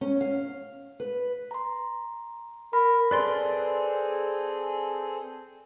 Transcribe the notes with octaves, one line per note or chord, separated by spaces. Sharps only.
C#4
F5
B4
A#5 C6
A#4 B5
C4 G#4 A4 B4 D5 C6